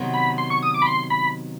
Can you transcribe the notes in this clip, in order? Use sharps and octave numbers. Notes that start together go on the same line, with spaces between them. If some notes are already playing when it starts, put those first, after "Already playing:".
Already playing: C3 D#3 F#3 B3
B5
C6
C#6
D#6
D6
B5
C6
B5